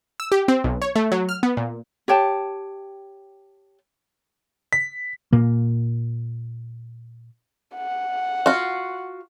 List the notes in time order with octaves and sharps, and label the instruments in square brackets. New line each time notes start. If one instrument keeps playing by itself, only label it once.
[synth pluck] E6
G4
C4
B1
C#5
A3
F#3
F6
B3
A#2
[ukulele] G4 C#5 G5 A5
[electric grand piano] B6
[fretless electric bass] A#2 A#3
[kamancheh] F#5
[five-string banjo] F4 F#4